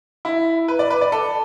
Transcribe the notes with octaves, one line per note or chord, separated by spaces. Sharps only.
E4
B4
D5
B4
D5
A4